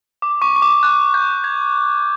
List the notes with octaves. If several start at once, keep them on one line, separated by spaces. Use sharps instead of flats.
D6
C#6
C#6
D6
F#6
G6
G#6